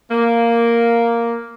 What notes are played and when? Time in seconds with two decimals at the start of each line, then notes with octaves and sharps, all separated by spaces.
0.11 A#3